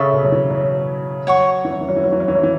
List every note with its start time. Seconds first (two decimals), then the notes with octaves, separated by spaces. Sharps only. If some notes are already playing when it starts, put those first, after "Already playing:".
Already playing: C#3 A4 E5 C#6
0.13 B2
0.24 F#3
0.32 E3
0.51 F#3
1.27 F#3 C#5 F#5 C#6
1.65 E3
1.72 F#3
1.81 E3
1.88 F#3
1.96 E3
2.04 F#3
2.12 E3
2.20 F#3
2.28 E3
2.35 F#3
2.43 E3